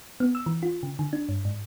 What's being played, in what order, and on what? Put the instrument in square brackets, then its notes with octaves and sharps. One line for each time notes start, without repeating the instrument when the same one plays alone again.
[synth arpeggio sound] B3
E6
E3
F4
C#3
D3
D4
G2
G#2